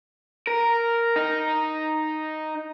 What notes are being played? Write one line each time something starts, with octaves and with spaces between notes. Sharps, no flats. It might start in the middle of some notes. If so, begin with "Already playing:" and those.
A#4
D#4